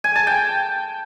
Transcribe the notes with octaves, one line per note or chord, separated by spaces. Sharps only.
G#5
A5
G5